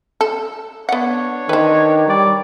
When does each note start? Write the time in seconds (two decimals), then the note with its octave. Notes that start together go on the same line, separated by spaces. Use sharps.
0.21 A4
0.89 B3 D4 C#5 F#5
1.49 D#3 B4 C5
2.08 G3 D5